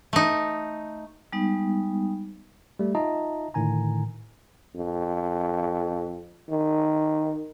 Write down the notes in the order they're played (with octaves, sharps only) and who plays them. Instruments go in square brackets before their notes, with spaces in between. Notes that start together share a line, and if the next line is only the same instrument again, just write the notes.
[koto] A3 D#4
[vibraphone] G3 G#3 B3 D#4
[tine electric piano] G3 A3
D#4 F4 D#5 E5 A5 A#5
A2 D3 D#3 G#5 A#5
[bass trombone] F2
D#3